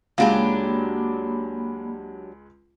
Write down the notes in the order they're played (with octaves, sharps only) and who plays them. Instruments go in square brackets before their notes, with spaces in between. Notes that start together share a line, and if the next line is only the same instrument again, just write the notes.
[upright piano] C#2 G#3 [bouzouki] F#3 D4 G4 [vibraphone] A#3 B5 [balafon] F5